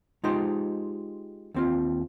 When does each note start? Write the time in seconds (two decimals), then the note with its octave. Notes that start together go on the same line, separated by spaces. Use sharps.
0.24 G#3 D#4 F4 G4 C5
1.54 D#2 C4 F4